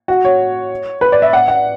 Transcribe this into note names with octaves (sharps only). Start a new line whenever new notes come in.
F#4
C#5
B4
D5
E5
F#5
F#5